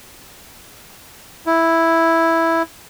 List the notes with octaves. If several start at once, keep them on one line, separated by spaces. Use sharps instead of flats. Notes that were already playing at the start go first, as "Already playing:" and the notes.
E4